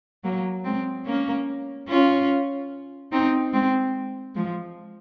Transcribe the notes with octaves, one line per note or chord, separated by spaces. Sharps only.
F#3 A#3
G#3 C4
A#3 C#4
C#4 F4
C4 D#4
G#3 C4
F3 G#3